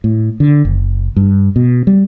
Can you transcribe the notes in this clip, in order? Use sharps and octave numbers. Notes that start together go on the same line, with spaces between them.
A2
D3
F#1
G2
B2
G3